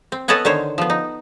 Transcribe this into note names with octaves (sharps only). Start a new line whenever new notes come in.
C4
B3 A4 C#5 D#5 F#5 G#5
D3 D#3 C5 C#5
F3 B3
D#4